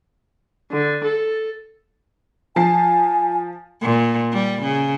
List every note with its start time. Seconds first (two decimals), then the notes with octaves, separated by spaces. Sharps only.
0.72 D3
1.04 A4
2.56 F3 G#5 A5 C7
3.81 A#2
4.32 G3
4.62 C#3